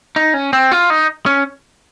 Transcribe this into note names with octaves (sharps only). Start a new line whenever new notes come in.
D#4
C#4
C4
F4
D#4
C#4